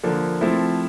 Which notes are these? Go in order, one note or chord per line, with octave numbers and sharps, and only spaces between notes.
D3 F3 A#3
F3 A3 C4 E4